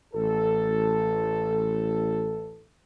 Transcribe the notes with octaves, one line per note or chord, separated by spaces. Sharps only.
A1 A4